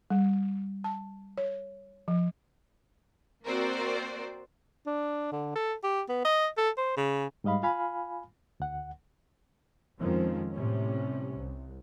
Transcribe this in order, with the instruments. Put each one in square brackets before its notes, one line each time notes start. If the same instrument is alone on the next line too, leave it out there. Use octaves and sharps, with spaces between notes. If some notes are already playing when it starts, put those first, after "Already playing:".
[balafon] G3
A5
C#5
F3
[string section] A#3 C4 F#4 A#4 C5 D5
[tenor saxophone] D4
D3
A4
G4
B3
D#5
A4
C5
C#3
[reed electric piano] G#2 G3 D#5 F5 B5
F4 F5 G#5 B5 F6
D2 F#5
[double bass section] F2 D#3 F3 G#3 C4 C#4
A2 C3 G3 C#4
C2